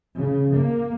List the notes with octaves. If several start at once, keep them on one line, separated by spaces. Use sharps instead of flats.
C#3
A#3